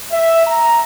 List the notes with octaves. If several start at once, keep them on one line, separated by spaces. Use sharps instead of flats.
E5
A#5